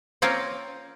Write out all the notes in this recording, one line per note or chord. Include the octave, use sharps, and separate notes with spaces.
A#3 C4 C#4 F4 A#4